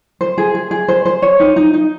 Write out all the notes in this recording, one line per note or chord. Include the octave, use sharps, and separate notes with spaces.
C5
G#4
G#4
G#4
C5
C5
C#5
D#4
D#4
D#4